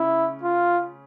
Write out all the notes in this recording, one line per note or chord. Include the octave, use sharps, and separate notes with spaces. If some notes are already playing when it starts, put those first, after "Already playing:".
Already playing: C#3 C#4 E4
F4